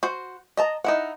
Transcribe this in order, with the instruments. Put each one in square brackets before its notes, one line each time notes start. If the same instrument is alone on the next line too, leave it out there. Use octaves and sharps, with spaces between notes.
[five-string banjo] F#4 C5
D#5 A5 A#5
D#4 E4 F#5